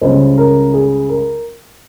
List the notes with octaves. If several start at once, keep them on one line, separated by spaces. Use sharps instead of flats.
C#2 C#3 G3 C5
A#4
G#4
A#4